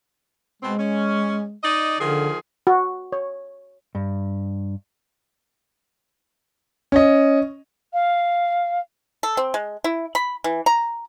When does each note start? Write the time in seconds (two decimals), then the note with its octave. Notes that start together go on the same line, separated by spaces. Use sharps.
0.62 B2 G#3 C4
0.79 C#4
1.62 D#4 D5 D#5
2.00 D3 D#3 F3 G#4
2.67 F#4
3.12 C#5
3.95 G2
6.92 C#4 D#5
7.93 F5
9.23 A4
9.37 C4
9.54 G#3
9.84 E4
10.15 B5
10.44 E3
10.66 A#5